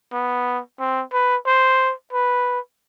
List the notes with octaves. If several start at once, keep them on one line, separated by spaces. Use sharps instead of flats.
B3
C4
B4
C5
B4